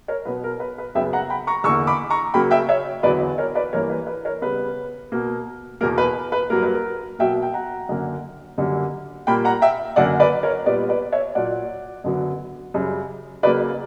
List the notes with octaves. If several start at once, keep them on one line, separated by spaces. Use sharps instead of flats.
A#4 C#5
B2 F#3 B3 B4
A#4
B4
B4
F#2 C#3 F#3 B3 E5 G5
F#5 A#5
G5 B5
A#5 C#6
E2 D3 A#3 C#6 E6
B5 D6
A#5 C#6
C#3 F#3 A#3 G5 B5
E5 G5
C#5 E5
E2 D3 F#3 B3 B4 D5
A#4 C#5
B4 D5
G2 E3 A#3 A#4 C#5
B4
B4
A#4 C#5
C#3 G3 B3 B4
B2 A#3
E2 B2 A#3 A#4
B4
B4
G2 F#3 A#3 A#4
B4
A#4
B2 F#3 A#3 E5 G5
G5
F#5 A#5
F#2 D3 A#3
F#2 D3 G3 A#3
A#2 G3 A#3 G5 B5
F#5 A#5
E5 G5
F#2 D3 A#3 D5 F#5
B4 D5
A#4 C#5
A#2 G3 B3 B4 D5
B4 D5
C#5 E5
A#2 F#3 A#3 D5 F#5
F#2 D3 F#3 B3
F#2 C#3 G3
C#3 F#3 A#3 B4 D5